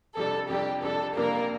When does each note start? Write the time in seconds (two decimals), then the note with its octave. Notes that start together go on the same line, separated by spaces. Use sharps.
0.17 F2 C3 G3 D4 A4
0.50 F2 C3 G3 D4 G4
0.83 F2 C3 G3 D4 A4
1.16 F2 C3 G3 A#3 D4 A#4